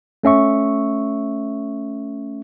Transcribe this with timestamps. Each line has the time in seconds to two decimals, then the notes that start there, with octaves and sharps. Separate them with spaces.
0.23 A3 C#4 E5 C#6